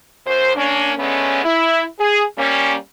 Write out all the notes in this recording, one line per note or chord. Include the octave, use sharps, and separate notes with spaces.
F#2 C5
A#3 C#4 D4
D3 G#3 A3 B3 C#4
E4
G#4
G3 A#3 C#4